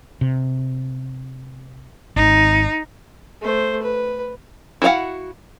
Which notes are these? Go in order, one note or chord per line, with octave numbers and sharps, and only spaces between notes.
C3
G#1 D#4
A3 C5
B4
E4 F#4 C5 F5 F#5